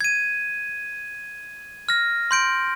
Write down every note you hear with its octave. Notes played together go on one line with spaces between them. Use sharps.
G#6 D#7
F6 A#6
C6 G6 D7